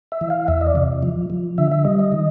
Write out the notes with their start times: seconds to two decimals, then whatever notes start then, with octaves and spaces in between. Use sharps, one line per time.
0.12 E5
0.21 E3
0.30 F5
0.48 E2 E5
0.61 D#5
0.66 D5
0.75 C3
1.03 F3
1.30 F3
1.58 D3 E5
1.71 E5
1.85 G3 D#5
1.99 D#5
2.12 D#3